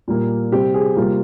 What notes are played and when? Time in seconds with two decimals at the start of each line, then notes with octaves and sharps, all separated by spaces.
0.08 A#2 G3 A#3
0.52 C3 G3 C4 G4
0.74 G#4
0.96 C3 G3 A#3 F4